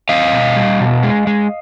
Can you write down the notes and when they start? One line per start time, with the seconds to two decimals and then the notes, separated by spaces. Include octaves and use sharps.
0.09 C4 D#5 F5
0.33 B2
0.56 G3
0.80 B2
1.03 G#3
1.27 G#3